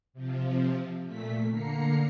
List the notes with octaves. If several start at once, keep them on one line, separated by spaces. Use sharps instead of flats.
C3 F3
A#2 A3 B6
D3 A#3 A#5 C7 C#7